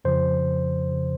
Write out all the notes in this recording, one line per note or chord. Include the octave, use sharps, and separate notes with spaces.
F2 C#3 F3 C5
C#3 F3